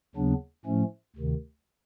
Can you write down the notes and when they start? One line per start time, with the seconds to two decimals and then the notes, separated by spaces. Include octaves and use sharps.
0.15 D#2 C#3 F#3 B3 D4
0.66 A2 F3 A3 C#4
1.16 D2 C3 D#3